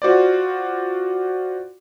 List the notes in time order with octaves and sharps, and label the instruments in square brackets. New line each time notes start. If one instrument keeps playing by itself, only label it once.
[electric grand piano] F4 F#4 C5 D5